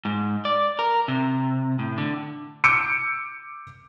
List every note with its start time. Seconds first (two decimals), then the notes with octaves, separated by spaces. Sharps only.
0.05 G#2
0.45 D5
0.79 A#4
1.08 C3
1.79 A2
1.98 D3
2.64 D6 E6 G6 C#7 D7